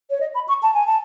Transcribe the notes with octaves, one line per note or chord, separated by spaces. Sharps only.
C#5
D#5
B5
C#6
A5
G#5
A5